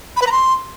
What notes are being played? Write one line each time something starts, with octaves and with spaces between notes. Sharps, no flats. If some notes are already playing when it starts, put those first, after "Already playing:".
B5
B4
A#5
C6